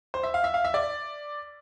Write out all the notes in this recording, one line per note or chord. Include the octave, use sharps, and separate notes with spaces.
C5
E5
F5
E5
F5
E5
D5